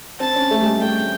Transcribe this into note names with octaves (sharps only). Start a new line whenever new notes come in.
C4 A5
C#4
A3
G3
G#3
A3 G5